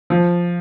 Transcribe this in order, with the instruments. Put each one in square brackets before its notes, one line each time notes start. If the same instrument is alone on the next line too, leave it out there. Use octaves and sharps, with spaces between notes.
[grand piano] F3